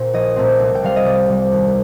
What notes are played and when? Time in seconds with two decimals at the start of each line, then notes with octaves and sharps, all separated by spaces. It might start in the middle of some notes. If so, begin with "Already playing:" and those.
Already playing: A#2 C4
0.13 A#1 D#5
0.36 A#2 A3 C4
0.60 C2
0.75 G5
0.82 C3 G3 F5
0.96 D#5
1.05 C2 D5
1.29 C3 G3
1.52 D#2